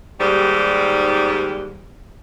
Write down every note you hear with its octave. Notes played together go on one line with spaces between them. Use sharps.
D#2 G#2 G3